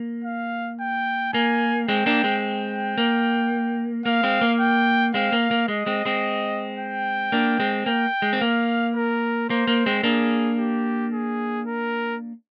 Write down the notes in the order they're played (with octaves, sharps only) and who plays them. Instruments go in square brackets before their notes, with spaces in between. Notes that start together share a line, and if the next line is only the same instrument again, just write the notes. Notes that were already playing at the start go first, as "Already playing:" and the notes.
Already playing: [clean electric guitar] A#3
[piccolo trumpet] F5
G5
[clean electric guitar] A#3 [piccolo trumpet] G#5
[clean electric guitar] G#3 C4 [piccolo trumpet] G5
[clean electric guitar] A#3 D4
G#3 C4
[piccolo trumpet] G5
[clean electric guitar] A#3
[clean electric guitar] A#3 [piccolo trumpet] F5
[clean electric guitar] G#3 C4
A#3
[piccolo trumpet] G5
[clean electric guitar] G#3 C4 [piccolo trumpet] F5
[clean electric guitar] A#3
A#3
[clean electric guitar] G#3 [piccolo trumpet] D#5
[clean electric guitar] G#3 C4
G#3 C4
[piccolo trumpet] G5
[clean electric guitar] A#3 D4
G#3 C4
[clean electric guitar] A#3 [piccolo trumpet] G5
[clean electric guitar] G#3
C4
[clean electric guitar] A#3 [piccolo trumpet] F5
[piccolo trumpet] A#4
[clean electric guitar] A#3 [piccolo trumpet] C5
[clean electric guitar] A#3
G#3 C4
[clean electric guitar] A#3 D4 [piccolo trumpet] G#4
[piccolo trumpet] G4
G#4
A#4